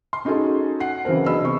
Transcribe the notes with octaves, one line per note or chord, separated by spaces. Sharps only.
C6
C#4 D#4 F#4 G#4 A4
F#5 C7
C#3 E3 F#3 C4 A#4
B3 D4 G#4 D#5 B5 E6
C3 C#6